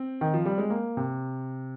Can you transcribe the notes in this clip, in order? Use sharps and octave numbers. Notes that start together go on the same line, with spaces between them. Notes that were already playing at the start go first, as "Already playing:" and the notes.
Already playing: C4
D#3
F3
G3
G#3
A#3
C3